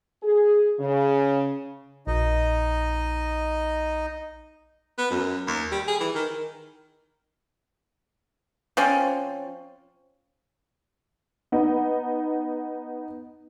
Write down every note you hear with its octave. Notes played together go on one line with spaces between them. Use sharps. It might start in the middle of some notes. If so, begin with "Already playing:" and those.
G#4
C#3
A#1 D#4 D#5
B3
F#2
D#2
G3
G#4
E3
D#3
F3 C4 C#4
B3 D#4